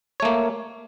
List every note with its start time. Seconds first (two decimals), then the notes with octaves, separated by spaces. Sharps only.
0.20 C#5
0.22 A3
0.25 A#3